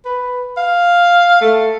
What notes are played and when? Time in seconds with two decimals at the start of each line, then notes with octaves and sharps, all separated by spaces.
0.05 B4
0.57 F5
1.41 A3